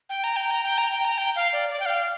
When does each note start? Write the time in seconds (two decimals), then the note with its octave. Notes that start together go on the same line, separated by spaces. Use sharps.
0.09 G5
0.24 A#5
0.36 G5
0.51 A#5
0.64 G5
0.78 A#5
0.91 G5
1.05 A#5
1.18 G5
1.36 F5
1.53 D5
1.70 D5
1.80 G5
1.86 F5